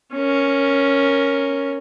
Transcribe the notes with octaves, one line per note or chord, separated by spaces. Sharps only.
C#4 A#4